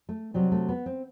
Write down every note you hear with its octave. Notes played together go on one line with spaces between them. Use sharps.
A3
C3 F#3 G3
A3
B3
C4